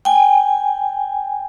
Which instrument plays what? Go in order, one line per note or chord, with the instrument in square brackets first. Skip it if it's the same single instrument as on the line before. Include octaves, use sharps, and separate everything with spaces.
[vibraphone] G5 G#5